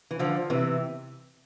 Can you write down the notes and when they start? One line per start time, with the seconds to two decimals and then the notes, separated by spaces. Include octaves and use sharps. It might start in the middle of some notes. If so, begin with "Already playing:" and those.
0.11 E3
0.19 D3 F3
0.50 C3 E3